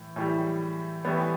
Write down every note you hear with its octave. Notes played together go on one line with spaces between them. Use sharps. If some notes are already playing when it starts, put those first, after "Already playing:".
Already playing: A2 E3
A2 E3 G3
A1 A2 G3 B3